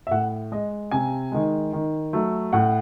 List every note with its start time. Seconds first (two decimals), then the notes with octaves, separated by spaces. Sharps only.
0.07 E5
0.11 A2 F#5
0.52 G#3 D#5
0.91 C3 G#5
1.32 D#3 G#3
1.73 D#3
2.13 F#3 A3
2.53 A2 F#5